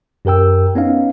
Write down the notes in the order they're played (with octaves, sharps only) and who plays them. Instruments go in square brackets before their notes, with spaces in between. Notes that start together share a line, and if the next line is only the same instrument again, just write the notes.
[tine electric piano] F#2 G4 A#4 G5 E6
B3 C#4 D#4 F5